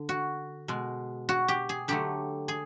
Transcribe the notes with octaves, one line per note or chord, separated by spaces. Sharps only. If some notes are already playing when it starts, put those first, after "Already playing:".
Already playing: D3
F#4
B2 G#3
F#4
G4
G#4
D3 F#3 A3 G4
G#4